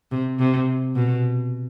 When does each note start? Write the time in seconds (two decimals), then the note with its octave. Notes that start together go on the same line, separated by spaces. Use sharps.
0.11 C3
0.40 C3
0.95 B2